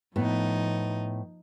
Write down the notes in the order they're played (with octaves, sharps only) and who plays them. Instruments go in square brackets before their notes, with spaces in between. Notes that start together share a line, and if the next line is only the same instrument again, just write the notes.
[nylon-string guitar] A2 B3 [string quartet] F3 D#4